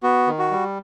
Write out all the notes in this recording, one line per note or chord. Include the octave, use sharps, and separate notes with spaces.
B3 F#4
D#3
F#4
G3